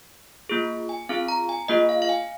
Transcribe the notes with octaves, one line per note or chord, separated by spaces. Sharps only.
A#3 F4 G#4
G#5
C4 F4 G#4 F5
A#5
G#5
A#3 F4 G#4 D#5
F5
F5
G#5